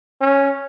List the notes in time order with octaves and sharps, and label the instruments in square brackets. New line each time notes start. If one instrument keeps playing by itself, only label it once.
[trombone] C#4